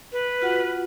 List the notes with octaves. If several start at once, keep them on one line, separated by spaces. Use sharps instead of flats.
B4
F4 F#4 F#5